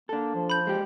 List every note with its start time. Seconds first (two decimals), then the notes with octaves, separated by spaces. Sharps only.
0.09 A#3 D4 A4
0.34 F3
0.50 B5 G6
0.67 G#3 G4